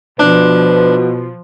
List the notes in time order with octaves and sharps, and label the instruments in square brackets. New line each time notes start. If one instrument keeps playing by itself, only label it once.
[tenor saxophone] B2 [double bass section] F3 [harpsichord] D4 [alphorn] B4